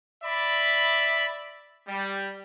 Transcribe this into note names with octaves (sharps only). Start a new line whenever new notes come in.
D5 E5 B5
G3